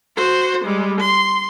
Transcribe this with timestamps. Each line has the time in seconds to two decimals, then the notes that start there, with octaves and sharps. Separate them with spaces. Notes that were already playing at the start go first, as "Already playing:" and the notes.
0.17 F#4 C5
0.64 G3 G#3
1.01 C6